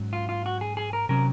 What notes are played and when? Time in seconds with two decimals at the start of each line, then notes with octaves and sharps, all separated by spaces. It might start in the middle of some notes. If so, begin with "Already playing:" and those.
Already playing: G#2 F#3 C#4
0.13 F4
0.29 F4
0.46 F#4
0.61 G#4
0.77 G#4
0.93 A#4
1.09 C3 F#3 C#4 A#4